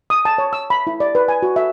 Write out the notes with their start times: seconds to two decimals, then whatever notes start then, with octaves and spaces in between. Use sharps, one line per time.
0.10 D#6
0.25 A5
0.38 C#5
0.53 E6
0.70 B5
0.87 E4
1.00 D5
1.15 B4
1.28 G#5
1.43 F#4
1.56 E5